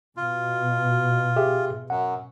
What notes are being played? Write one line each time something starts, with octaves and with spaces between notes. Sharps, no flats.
B2 F4
G4 G#4 E5
F#2 F#5